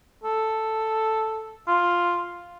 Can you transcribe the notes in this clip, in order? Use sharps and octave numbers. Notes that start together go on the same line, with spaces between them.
A4
F4